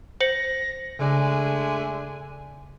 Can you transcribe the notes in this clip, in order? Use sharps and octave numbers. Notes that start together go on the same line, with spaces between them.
C5 A#6 C#7 F#7
C#3 G#3 A3 D4 G#5